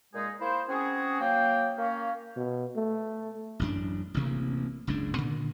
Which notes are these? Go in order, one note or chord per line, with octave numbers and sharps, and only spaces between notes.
A#2 G#3 D#4 G#4
A#3 E4 C5
C4 C#4 F#4 G#4
F#3 A#3 G5
A#3 C#4
B2
A3
A1 F#2 D4
A1 D2 C3 A#3
F#1 C#2 G#2 D4
A#2 D3 D#3